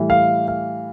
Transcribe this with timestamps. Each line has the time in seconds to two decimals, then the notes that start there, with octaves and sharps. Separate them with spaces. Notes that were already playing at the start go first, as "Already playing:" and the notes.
Already playing: A2 E3 G3
0.10 F5
0.48 F5